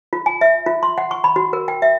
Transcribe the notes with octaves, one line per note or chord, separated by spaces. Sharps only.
F4
G#5
E5
F4
C6
F#5
C#6
B5
F#4
A#4
G5
E5